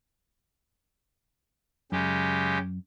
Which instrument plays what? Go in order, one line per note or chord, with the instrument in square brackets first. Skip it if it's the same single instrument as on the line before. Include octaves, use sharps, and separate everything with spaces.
[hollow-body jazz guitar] F#2 [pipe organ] C#3 G#3 G4